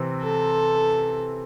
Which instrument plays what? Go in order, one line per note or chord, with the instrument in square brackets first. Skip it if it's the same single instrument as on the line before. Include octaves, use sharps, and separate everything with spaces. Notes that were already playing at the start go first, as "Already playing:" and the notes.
Already playing: [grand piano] C3 E3 C4
[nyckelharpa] A4